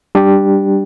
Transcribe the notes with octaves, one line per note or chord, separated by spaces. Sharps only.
G3 D4 G4